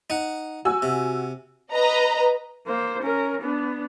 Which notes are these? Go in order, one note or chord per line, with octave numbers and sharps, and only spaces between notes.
D#4 F#5
F#4 G#5 E6
C3
B4 D#5 A#5
A#3 C5
C#4 A#4
B3 D4